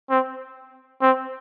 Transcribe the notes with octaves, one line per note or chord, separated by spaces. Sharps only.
C4
C4